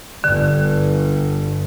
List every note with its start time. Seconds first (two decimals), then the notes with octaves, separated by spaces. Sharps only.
0.24 G1 G2 D3